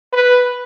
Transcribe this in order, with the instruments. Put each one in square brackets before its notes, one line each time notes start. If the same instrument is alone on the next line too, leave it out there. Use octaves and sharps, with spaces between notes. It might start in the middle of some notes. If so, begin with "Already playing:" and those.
[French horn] B4